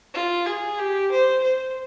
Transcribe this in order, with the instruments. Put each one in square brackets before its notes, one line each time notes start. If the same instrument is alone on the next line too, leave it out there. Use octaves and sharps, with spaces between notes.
[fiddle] F4
G#4
G4
C5
C5